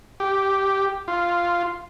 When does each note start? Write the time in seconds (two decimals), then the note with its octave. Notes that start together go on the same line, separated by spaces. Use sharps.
0.20 G4
1.08 F4